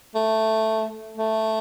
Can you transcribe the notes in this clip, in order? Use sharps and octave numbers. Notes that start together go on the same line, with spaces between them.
A3
A3